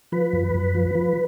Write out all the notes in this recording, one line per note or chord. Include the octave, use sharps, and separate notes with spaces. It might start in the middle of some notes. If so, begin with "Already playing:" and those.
F3 B4
F#2
F#2
F3
F3